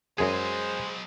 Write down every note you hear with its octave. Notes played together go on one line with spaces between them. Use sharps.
F#2 F#3 G#3 G#4 C5 D#5